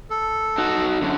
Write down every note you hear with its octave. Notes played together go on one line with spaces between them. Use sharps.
A4
D#4 F#4
F#2 D3 E4